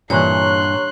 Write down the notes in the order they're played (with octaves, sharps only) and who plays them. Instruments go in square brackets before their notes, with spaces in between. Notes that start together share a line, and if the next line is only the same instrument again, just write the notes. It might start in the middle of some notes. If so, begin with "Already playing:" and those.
[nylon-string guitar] G2 [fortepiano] A#2 E3 [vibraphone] C#5 A#5 C#6 [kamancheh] C6 F#6